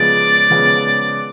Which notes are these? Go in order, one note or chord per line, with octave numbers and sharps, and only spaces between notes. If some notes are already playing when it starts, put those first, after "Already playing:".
Already playing: C#3 F3 G#3 B3 D5
C#3 F3 G#3 B3